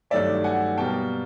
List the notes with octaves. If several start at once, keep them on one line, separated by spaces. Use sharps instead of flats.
G2 D#3 F#3 A3 C#4 D5 E5
F#5 G#5
B2 G3 A#3 G5 A5